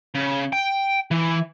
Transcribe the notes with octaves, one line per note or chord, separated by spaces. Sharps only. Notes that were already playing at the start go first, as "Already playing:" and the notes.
C#3
G5
E3